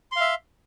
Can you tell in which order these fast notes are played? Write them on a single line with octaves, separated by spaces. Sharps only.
C6 F5 E5